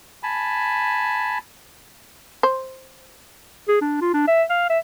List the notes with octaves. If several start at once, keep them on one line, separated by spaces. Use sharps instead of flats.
G#5 A5 B5
C5
G#4
D4
F4
D4
E5
F5
E5